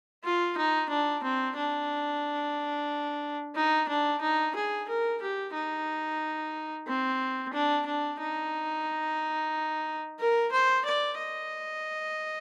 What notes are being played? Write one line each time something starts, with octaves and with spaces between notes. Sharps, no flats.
F4
D#4
D4
C4
D4
D#4
D4
D#4
G#4
A#4
G4
D#4
C4
D4
D4
D#4
A#4
C5
D5
D#5